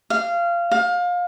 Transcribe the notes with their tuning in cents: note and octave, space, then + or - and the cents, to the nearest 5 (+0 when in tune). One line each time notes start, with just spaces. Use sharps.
F5 -20
F5 +25